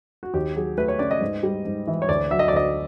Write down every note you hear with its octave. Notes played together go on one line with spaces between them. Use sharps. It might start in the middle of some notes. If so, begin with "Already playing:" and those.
F#4
D#2 G4
F#3 G#4
A3 B4
C#5
C#3 D5
D#5
G#2
G3
G#2
E3
C#5
D2 D5
F#3 E5
D#5
D5
D2 D#5